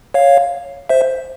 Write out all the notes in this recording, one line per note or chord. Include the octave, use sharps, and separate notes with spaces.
C#5 F5
C5 E5